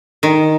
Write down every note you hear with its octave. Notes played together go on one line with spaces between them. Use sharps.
D#3